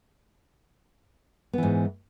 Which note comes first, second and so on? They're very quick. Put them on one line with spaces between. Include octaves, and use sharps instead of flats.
B3 E3 G#2